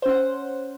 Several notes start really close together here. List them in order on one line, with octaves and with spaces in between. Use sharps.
C5 C#4 F#5